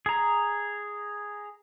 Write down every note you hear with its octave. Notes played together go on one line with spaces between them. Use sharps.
G#4 A#5